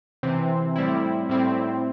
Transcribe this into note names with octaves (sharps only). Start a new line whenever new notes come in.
C3 E3 C4
A2 G3 C4 E4
A2 G3 C4 E4